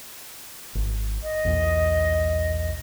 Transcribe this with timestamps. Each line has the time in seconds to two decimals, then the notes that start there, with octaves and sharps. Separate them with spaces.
0.75 G#1
1.23 D#5
1.45 B1 E2 A#2